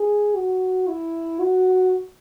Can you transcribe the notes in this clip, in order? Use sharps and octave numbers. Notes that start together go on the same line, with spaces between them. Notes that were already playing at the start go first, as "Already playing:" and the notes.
Already playing: G#4
F#4
E4
F#4